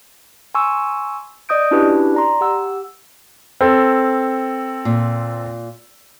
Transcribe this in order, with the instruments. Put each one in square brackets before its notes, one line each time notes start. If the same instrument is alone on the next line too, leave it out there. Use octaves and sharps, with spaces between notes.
[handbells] G#5 C6 C#6 E6
D5 D#5 D#6 G6 D7
C#4 D4 E4 F#4 G4 B4
D5 A#5 C6
G4 F#5 E6
[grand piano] C4 A4
[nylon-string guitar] A#2